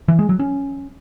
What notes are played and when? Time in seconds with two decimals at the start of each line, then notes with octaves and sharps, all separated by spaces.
0.08 E3
0.19 G#3
0.29 F#3
0.39 C#4